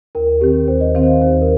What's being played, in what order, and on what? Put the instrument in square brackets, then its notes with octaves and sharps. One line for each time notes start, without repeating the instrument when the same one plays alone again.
[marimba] D#2 [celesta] A#4
[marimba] D#3 C4 [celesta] G4
[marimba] D#2 [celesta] C5
[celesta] D#5
[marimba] D#3 C4 [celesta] F5
[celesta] C5
D#5
[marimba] D#2 [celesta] C5
[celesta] A#4